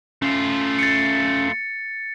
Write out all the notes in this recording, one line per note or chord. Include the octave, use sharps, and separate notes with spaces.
A3 C#4 F4
A6 C#7